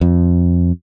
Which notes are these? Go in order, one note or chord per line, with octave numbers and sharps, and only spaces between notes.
F2